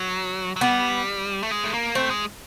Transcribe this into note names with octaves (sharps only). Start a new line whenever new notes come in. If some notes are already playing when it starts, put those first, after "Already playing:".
Already playing: F#3
F#3
G3 B3
A3
G#3
A3
A#3
A3 C4
G#3